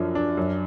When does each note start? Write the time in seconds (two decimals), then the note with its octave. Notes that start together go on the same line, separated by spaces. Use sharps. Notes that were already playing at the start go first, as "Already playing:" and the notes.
Already playing: F#2 F3 D4
0.15 D4
0.37 F#2